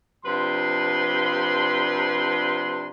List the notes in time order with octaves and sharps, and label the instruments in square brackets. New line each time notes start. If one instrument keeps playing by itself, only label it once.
[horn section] C3 F3 D4 B4 C6